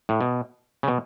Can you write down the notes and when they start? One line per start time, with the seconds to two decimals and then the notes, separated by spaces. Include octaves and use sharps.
0.09 A2
0.21 B2
0.83 C#3
0.88 B2